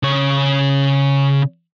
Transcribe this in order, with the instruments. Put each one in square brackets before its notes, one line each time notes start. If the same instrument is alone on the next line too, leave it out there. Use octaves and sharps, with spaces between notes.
[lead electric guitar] C#3 C#5